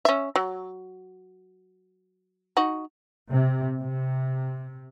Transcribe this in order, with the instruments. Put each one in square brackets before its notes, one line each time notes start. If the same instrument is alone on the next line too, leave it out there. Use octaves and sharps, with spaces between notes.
[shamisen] C#4 E5
F#3
D#4 F#4
[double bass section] C3
C3